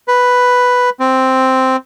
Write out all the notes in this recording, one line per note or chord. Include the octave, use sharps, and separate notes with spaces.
B4
C4